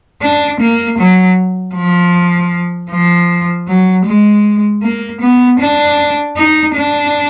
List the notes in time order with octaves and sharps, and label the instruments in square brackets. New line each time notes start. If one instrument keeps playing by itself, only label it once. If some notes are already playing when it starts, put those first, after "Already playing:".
[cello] D4
A#3
F#3
F3
F3
F#3
G#3
A#3
B3
D4
D#4
D4